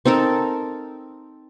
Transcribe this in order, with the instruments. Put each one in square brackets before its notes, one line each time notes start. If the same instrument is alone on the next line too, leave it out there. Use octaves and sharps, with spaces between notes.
[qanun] C4 D#4 A4 A#4